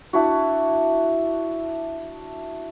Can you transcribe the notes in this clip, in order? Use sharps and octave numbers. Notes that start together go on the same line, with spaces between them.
D4 E4 F#4